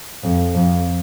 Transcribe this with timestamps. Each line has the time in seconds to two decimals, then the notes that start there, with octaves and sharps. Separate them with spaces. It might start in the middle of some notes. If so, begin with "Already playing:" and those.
0.23 F2
0.55 F2